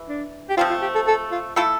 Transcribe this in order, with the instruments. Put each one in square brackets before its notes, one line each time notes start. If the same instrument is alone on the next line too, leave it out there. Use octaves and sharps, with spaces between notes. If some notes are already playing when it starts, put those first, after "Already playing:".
Already playing: [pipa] E3
[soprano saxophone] D4
G4
[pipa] F3 A3 C4 [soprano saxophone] F4
[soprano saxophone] F4
G4
A4
A4
F4
[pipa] A3 E4 A4 [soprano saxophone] F4